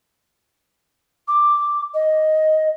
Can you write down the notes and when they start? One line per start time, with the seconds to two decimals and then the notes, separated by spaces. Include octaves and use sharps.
1.27 D6
1.94 D#5